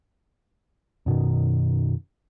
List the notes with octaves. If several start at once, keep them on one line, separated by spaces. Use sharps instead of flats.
F#2 B2 D#3